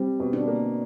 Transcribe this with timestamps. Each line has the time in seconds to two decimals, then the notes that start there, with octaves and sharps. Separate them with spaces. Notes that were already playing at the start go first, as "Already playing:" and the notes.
Already playing: G3 C4
0.20 B2
0.33 D4
0.48 A#3